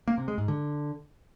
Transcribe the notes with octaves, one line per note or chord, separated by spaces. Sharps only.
A#3
C3
G#3
G#2
D3